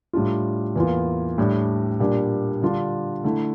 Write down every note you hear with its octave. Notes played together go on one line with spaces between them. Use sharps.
A2 G3 D4 F4
E2 E3 A#3 F4
A2 G3 D4
A#2 G3 D4
D3 G3 D4 F4
D3 A3 E4